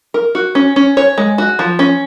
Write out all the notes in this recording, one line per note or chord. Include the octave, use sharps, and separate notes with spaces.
A#4
F#4
C#4
C#4
C#5
G#3
F#4
F3
C#4